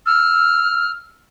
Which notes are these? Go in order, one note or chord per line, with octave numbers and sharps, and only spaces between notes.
E6 F6